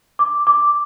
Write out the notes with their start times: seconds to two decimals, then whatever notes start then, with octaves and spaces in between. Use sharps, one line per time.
0.19 D6
0.47 D6